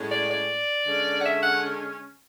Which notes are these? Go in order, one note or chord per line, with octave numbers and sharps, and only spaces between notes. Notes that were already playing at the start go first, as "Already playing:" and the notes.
Already playing: A2 G#3 C#4
D5
D5
D3 G#3 C#4
F#5
E5
F#5